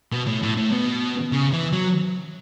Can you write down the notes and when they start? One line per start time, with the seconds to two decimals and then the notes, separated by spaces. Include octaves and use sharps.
0.12 B2
0.27 A2
0.43 A2
0.58 A2
0.72 B2
1.32 C#3
1.53 E3
1.73 F#3